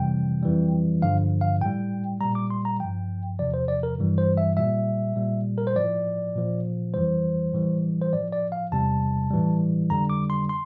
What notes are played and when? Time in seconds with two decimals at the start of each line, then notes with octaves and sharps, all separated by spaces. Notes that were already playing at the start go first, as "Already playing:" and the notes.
Already playing: F2 C3 E3 G3 G5
0.43 F2 E3 G3
1.02 G2 D3 F3 F5
1.41 F5
1.61 A2 G3 G5
2.21 A#2 G3 A#5
2.35 D6
2.50 C6
2.65 A#5
2.80 G2 F3 G5
3.39 E2 C3 F3 D5
3.54 C5
3.68 D5
3.83 A#4
3.98 G2 E3 G3
4.18 C5
4.37 E5
4.57 A#2 G3 E5
5.16 A#2 G3
5.58 A#4
5.67 C5
5.76 A2 F3 D5
6.35 A#2 F3
6.94 F2 E3 G3 C5
7.53 A2 E3 G3
8.02 C5
8.12 A2 F3 D5
8.33 D5
8.52 F5
8.72 E2 C3 G3 A5
9.31 A2 E3 G3
9.90 F2 D3 G3 A#5
10.10 D6
10.30 C6
10.49 C6